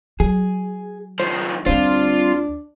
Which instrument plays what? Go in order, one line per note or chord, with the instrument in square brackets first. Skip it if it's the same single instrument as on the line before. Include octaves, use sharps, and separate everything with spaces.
[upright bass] F#3 [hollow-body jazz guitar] G#4
[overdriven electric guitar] D#3 F3 [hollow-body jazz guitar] C5
[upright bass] D2 D3 [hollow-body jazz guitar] G3 C4 C5 [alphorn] D4 [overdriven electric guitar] F4